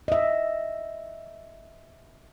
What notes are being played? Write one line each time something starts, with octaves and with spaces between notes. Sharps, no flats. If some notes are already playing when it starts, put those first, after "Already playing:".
D#5 E5